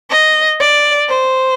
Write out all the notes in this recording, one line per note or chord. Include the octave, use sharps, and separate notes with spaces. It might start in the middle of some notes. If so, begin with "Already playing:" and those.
D#5
D5
C5